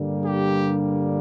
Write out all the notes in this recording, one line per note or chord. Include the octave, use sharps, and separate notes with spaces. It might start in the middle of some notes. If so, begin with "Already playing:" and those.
Already playing: G2 D3 G3 A#3
G4